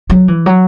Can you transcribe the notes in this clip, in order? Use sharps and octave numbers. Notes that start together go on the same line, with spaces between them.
F#3
E3
F#3